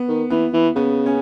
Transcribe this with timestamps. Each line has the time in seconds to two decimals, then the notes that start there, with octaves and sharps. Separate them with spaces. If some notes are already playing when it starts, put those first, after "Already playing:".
Already playing: B3
0.08 D#3
0.30 E3 B3
0.53 E3
0.76 C#3 B3
1.06 C#4